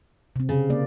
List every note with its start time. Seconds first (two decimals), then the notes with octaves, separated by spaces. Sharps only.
0.36 C3 C4
0.49 C#3
0.70 A#3 D5